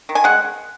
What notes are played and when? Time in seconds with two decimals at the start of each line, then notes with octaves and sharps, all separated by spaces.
0.09 D#3
0.15 G#5
0.24 G#3 F#5